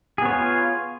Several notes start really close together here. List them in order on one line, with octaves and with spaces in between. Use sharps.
G#4 B3 C#5 F4